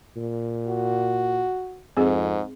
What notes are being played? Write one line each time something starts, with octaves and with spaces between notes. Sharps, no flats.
A#2
F#4
F2 G#2 C4 G#4